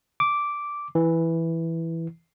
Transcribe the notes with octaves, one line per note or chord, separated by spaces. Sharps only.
D6
E3